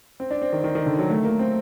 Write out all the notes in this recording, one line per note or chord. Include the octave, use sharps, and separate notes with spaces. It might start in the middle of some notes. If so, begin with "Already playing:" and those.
C4
D4
C4
D#3
D#3
D#3
D3
F#3
A3
A#3
C4